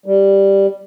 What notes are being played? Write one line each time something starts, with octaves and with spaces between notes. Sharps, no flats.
G3